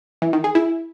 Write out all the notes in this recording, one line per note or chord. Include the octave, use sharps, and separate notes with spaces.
E3
D#3
G#4
E4